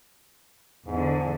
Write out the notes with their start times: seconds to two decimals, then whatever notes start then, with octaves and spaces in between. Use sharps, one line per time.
0.87 E2 G#2 D3